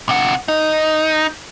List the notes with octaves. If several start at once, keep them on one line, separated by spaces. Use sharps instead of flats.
C3 F#5
D#4